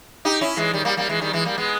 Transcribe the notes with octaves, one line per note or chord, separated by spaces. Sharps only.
D#4 G4
C#4 E4
E3 G#3
D#3 G3
G3 A#3
G3 A#3
E3 G#3
D#3 G3
E3 G#3
G3 A#3
G#3 B3